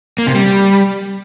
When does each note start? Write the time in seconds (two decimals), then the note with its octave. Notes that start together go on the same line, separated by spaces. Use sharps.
0.18 A#3
0.27 C3
0.35 G3